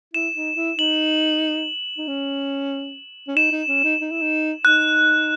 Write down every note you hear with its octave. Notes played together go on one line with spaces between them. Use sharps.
E4 E7
D#4
E4
D#4 F#7
D#4
C#4
C#4
D#4 E7
D#4
C#4
D#4
D#4
E4
D#4
D#4 F#6